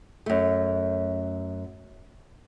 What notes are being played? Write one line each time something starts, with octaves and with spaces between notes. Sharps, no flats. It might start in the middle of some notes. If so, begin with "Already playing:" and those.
F#2 A3